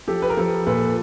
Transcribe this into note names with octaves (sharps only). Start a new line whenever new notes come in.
F3 G4 A4
B4
A#4
F3 G4 A4
A#2 A4 B4